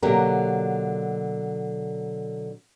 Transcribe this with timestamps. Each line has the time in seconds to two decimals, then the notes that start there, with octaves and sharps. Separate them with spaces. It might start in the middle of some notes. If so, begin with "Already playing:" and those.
0.02 B2 D3 F#3 A#3 G4 A#4